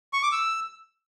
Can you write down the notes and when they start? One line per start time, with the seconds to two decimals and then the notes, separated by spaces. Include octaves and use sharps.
0.13 C#6
0.23 D6
0.32 E6